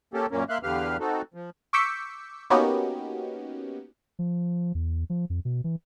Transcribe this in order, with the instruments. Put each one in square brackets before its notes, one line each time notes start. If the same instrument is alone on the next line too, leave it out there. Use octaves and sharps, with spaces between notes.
[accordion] A#3 C#4 G4 A4
F#2 A#2 A#3 C#4
A#3 E5 F5 C6 F#6
E2 D3 G4 B4 F5 F6
C4 D#4 F#4 A4
F3
[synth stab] C#6 D6 E6 G6 B6 C#7
A#3 B3 C#4 D#4 F#4 G4
[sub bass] F3
E2
F3
F2
B2
E3